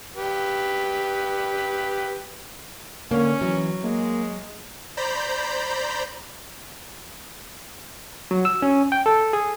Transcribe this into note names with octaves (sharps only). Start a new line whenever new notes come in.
G4 B4
D3 A#3 C#4
E3 F#3
G#3 A#3
C5 D5 A#5 B5 G6
F#3
E6
C#4
G5
A4
G#4